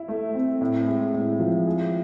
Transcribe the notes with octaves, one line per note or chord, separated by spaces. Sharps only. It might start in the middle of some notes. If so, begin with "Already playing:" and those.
Already playing: E4
A3
C4
A2
G#3
A2
F3
G#4